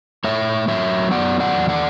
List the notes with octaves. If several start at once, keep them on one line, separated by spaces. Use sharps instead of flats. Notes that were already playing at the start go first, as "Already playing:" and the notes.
A3 C#5 E5
F#3 C#5 E5
B3 D5 F#5
D5 F#5
E2
D5 F#5